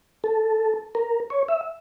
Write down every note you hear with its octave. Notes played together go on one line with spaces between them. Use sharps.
A4
A#4
C#5
E5